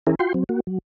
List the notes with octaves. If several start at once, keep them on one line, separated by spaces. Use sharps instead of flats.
E3 C#4 E4 G#4 A#4
F4 F#4 G5 C6
F#3 C4
A#3 F#4
F#3